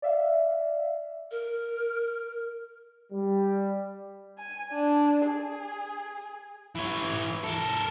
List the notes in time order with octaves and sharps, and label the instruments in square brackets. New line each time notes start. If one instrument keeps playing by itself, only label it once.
[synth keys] D5 E5 F5
[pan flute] A#4
[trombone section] G3
[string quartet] G#5
D4
G#4
[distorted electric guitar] E3 C#5
A4 A#4